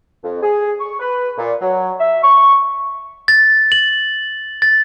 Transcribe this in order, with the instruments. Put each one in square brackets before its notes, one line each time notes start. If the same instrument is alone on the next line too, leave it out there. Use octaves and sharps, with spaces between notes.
[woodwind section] F2
G#4
C#6
B4
A#2
F#3
E5
C#6
[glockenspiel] A6
F#7
A6